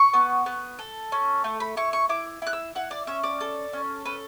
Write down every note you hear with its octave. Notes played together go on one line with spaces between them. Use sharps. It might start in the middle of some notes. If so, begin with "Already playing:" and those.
Already playing: C#6
B3
B3
A4
C#4
A3
B5
E4 C#6
C#6
E4 D6
E4 F#6
E6
E4 F#5
D5
C#4 E5
D5
A4
C#4
A4 B4